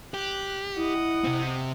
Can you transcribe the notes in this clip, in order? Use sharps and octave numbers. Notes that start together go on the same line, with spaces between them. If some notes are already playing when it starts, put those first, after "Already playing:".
G4 F#6
E4 D#5 F#5
C3 C4